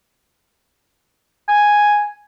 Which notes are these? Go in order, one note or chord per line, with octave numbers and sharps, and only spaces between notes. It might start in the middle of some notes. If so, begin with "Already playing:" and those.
G#5